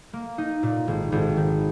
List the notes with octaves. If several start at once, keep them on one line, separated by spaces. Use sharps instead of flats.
A#3
D#4
A#2
G#1
G#1
D#3